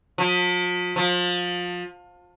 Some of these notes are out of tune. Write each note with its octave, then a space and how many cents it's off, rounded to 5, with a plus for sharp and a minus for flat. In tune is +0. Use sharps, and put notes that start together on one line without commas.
F3 +40
F3 +25